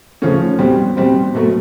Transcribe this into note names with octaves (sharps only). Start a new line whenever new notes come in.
C#3 F3 A3 C#4
B2 G3 C4
B2 G3 C4
B2 F#3 A3